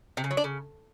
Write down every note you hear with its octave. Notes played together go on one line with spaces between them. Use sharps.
C3
C#3
F#3
D4
C#3